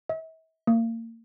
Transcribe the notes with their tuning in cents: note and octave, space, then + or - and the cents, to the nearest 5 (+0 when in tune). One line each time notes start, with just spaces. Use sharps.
E5 -40
A#3 -35